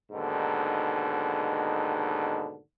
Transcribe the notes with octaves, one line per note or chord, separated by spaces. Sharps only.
D#2 G#2 B2 D3